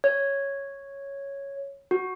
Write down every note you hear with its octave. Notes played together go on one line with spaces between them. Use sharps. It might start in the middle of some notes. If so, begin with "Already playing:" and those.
C#5
F#4